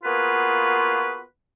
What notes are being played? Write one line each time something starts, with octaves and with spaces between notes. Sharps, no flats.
A#3 B3 F4 F#4 G#4 B4